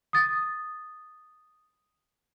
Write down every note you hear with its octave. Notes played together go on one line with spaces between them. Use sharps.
D#6 A6